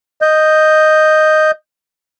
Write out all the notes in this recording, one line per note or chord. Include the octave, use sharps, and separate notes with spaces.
D#5 G6